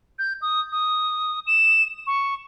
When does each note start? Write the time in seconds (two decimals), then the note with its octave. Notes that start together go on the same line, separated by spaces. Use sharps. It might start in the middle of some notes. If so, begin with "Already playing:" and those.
0.19 G6
0.42 D#6
0.72 D#6
1.47 E7
2.07 C#6